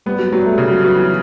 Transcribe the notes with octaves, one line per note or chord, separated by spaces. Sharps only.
G3 B3
F#3
F#3 G3
A3
C#3 G3
F#3
F#3 B3
E3